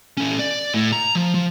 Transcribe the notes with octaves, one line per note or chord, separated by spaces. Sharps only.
C#4 A4
D5
A2
A#5
F3
F3